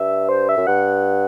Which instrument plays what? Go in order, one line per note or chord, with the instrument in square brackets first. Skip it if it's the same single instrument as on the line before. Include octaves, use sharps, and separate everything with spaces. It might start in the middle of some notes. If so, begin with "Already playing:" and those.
Already playing: [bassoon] G2 [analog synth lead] E5
[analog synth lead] C5
E5
[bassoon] F#2
[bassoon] G2 [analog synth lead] F#5